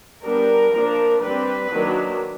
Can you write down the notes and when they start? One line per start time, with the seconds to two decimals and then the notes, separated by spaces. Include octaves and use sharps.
0.23 G3 B3 D4 A#4
0.73 F3 A#3 D4
1.21 G3 C4 B4
1.71 D#3 F#3 A#3 D4